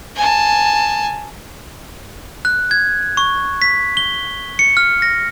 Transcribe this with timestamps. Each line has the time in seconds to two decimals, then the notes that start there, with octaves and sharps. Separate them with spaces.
0.16 G#5 A5
2.45 F#6
2.71 G#6
3.17 C#6
3.62 B6
3.97 G7
4.59 C#7
4.77 F6
5.02 A#6